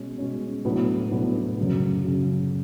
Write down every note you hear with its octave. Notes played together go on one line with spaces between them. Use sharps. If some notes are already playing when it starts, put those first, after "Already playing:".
Already playing: B2 G#3 C#4
B2 G#3 C#4
A2 F#3 B3 D4
A2 F#3 B3 D4
F#2 C#3 F#3
F#2 C#3 F#3